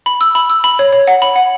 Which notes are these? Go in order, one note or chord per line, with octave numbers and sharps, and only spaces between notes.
B5
E6
B5
E6
B5
C#5
C#5
F#5
B5
F#5